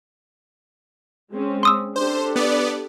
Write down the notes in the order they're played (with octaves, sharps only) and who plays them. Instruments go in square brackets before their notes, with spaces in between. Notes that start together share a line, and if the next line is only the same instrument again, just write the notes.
[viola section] G#3 C4 C#4
[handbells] C6 D#6 E6
[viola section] D4 G4 A4 [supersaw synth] C5
[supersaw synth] B3 D5